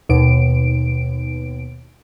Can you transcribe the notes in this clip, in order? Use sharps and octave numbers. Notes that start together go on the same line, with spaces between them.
D#2 B2 D7